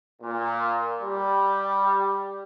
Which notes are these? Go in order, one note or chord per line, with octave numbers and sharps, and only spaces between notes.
A#2
G3